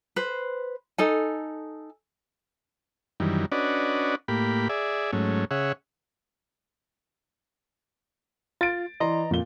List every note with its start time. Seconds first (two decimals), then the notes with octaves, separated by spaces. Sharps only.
0.16 B4 C5
0.98 D#4 A4 G#5
3.20 F#2 D#3 E3 G3
3.52 C#4 D4 F#4 B4 D5 D#5
4.28 A2 A#3 G4 B5
4.69 G#4 D5 E5
5.13 G#2 F#3 A3 C#4
5.51 C#3 G#4 C#5 E5 F#5
8.61 F4 A6 D7
9.00 E3 D5 D#5 A#5 C6
9.31 F2 A#2 G7